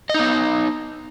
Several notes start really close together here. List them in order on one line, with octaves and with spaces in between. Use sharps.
D#5 D#4 B3